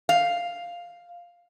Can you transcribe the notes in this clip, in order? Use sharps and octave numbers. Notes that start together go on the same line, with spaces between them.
F5